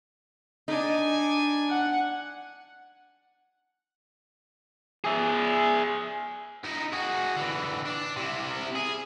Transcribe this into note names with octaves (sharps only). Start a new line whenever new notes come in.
D4 D#4 G#5
F#5
G#4 E5
D#4 E4
F#4 G#4
D3 E3
D4
C3 E4
G#4